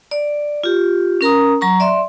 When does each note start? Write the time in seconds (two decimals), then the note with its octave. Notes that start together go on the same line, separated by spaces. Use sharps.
0.11 D5
0.64 F4 G4
1.21 C#4 A#4 A#5 D#6
1.61 F#3 A#5 C#6
1.80 D5 E5 C6